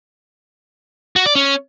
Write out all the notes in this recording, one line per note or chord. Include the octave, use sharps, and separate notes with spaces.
F#4
D5
C#4